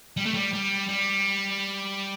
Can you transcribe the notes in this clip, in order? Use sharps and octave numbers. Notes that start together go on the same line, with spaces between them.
G3
A3
G3
G3
G3